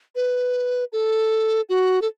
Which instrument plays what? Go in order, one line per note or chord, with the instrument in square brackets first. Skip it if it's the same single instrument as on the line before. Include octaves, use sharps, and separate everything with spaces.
[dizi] B4
A4
F#4
A4